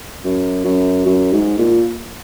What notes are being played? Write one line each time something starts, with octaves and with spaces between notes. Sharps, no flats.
F#2
F#2
F#2
G#2
A#2